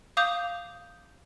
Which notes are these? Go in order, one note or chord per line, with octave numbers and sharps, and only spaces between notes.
F5 D6 D#6 G6 F7